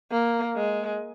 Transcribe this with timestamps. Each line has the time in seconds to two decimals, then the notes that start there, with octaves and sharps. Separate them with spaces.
0.12 A#3
0.56 G#3